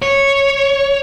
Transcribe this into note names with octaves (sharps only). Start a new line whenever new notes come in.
C#5